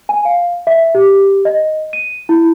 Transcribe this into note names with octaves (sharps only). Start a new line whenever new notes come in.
G#5
F5
E5
G4
D#5
D#7
E4